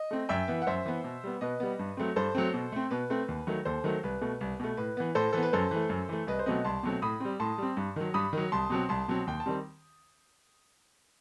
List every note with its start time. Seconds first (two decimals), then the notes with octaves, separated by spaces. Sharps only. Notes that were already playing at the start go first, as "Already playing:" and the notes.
Already playing: D#5
0.11 A3 C4
0.29 F#2 E5 G5
0.48 E3 B3
0.62 F#5
0.67 F#2 C5 E5
0.85 E3 B3
1.04 B2
1.23 G3 B3
1.41 B2 B4 D#5
1.60 G3 B3
1.79 G2
1.97 F#3 A3 C4
2.16 G2 A4 C5
2.35 F#3 A3 C4
2.54 B2
2.72 A3 C4
2.91 B2 B4
3.10 A3 C4
3.28 D#2
3.47 D#3 F#3 A3
3.65 D#2 A4 C5
3.84 D#3 F#3 A3
4.03 C2 B4
4.21 B2 A3
4.41 C2
4.60 B2 A3
4.77 A2 B4
4.97 E3 B3
5.15 A2 A4 C5
5.33 E3 B3 A4
5.43 B4
5.53 F#2 A4 C5
5.71 E3 A3
5.89 F#2
6.09 E3 A3
6.27 C2 B4 D#5
6.39 C5
6.46 B2 F#3 A3 C4 B4 D#5
6.64 C2 A5 C6
6.83 B2 F#3 A3 C4
7.02 A2 B5 D#6
7.20 G3 C4
7.40 A2 A5 C6
7.58 G3 C4
7.77 G2
7.96 D#3 F#3
8.14 G2 B5 D#6
8.33 D#3 F#3
8.52 C2 A5 C6
8.70 B2 F#3 C4
8.89 C2 A5 C6
9.08 B2 F#3 C4
9.27 D#2 G5
9.40 A5
9.46 D#3 G3 C4